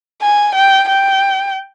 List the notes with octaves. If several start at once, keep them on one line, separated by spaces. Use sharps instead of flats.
G#5
G5
G5